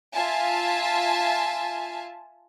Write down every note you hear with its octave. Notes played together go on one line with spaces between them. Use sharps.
F4 E5 G#5 A5